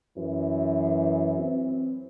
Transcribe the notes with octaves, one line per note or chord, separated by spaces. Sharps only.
F#2 E3
C4